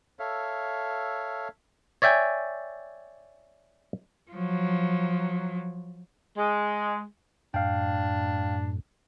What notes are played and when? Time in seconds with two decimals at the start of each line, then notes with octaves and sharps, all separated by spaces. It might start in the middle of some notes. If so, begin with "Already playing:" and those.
0.19 A4 C#5 E5 F5
2.02 C#5 D5 E5 G5 G#5
4.32 F3 F#3
6.37 G#3
7.54 F#2 A2 D4 F5 G5